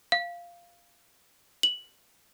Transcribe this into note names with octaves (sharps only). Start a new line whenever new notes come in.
F5
F#7